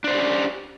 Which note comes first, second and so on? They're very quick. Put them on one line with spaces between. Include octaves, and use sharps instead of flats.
D4 C5 D5 G4 C#4